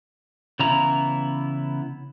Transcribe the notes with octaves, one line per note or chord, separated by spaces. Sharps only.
C#3 E3 B3 E4 A#5